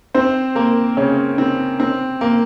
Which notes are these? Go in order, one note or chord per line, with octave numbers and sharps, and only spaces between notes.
C4 C5
A#3 A#4
C#3 C#4
C4
C4
A#3